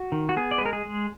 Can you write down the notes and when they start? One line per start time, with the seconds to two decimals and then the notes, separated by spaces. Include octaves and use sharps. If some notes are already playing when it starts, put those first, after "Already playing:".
Already playing: F#4
0.12 D#3
0.29 F#4
0.37 B3 G#4
0.51 D5
0.58 B4
0.61 G#3 A#4
0.73 G#4
0.85 G#3